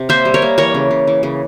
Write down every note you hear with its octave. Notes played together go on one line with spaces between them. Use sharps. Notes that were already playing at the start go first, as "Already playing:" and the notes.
Already playing: C3
A#3 C5 E5
G3
A#4 C#5
A#3
E3 A#4 C#5
C#3
C#3
E3
C#3